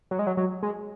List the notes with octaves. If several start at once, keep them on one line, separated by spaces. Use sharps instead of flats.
F#3
G#3
F#3
F#3
G#3